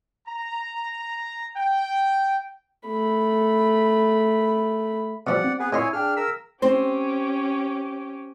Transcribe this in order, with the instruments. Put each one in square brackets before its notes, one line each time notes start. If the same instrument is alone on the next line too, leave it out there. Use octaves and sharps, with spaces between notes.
[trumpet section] A#5
G5
[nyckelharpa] A3 B5
[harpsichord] B2 F3 G3 [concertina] D5 F#5
[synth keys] C4
[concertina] B3 G#4 B4
[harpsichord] A#2 D#5 C6 [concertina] E4 C#5 G#5
[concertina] D4 F6 [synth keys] G#4 F5 G5
[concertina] A#4 E6 [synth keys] B6
[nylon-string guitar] C4 C5 [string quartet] C#4 G4